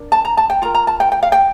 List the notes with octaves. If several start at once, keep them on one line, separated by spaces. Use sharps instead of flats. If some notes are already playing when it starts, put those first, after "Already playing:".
Already playing: D4 A#4
A5
A#5
A5
G5
F4 A#4 A#5
A#5
A5
G5
G5
F5
G5